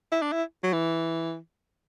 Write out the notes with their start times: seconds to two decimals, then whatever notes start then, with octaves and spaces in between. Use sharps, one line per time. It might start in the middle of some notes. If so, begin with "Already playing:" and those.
0.12 E4
0.22 D4
0.32 E4
0.63 F#3
0.73 E3